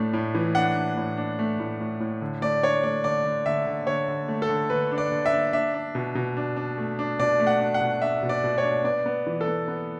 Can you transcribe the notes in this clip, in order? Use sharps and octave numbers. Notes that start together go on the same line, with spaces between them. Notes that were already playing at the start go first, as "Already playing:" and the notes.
Already playing: A2 A3 D4
A2
E3
D4 F#5
D4
A2
D4
A3
A2
A2
A2
D3
A3 D5
D4 C#5
A3 D5
D3 D5
D3
D3 E5
D3
D3 C#5
D3
A3
A4
D3
D3 B4
D4
D5
D3
E5
D4
D4 E5
D4
B2
B2
D4
D4
A3
D4
B2 D5
A3
F#5
D4
F#5
B2
D4 E5
B2
D5
B2
C#5
D4
B3 D5
B3
E3
A4
B3
B3